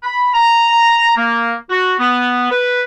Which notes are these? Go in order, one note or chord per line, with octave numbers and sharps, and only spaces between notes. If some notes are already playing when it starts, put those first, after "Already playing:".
B5
A#5
A#3
F#4
B3
B4